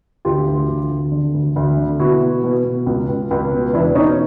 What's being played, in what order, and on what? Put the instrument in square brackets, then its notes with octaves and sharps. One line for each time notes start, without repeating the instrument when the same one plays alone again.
[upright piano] D2 F4 G4
D2
D2
D2
D3
D2
D2
D3
B2 E4 F#4
B2
B2
B2
C#2
C#2
C#2
B2
E2 D4 E4
B2 C#4 D#4